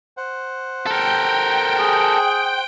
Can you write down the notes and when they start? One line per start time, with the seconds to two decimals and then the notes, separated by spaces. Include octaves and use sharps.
0.17 C5 F#5
0.86 A4 A#4 G5
1.79 G#4